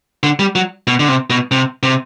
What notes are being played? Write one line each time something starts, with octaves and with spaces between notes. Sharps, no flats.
D3
G3
F#3
B2
D3
C3
B2
C3
C3